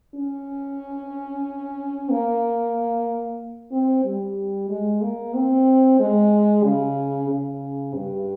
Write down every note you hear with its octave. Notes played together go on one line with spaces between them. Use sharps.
C#4
A#3
C4
G3
G#3
A#3
C4
G#3
C#3
C#3
G2